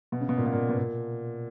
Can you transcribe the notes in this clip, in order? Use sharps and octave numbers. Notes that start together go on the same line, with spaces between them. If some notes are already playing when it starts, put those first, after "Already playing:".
B2
C#3
B2
A#2
B2
A#2
B2
A#2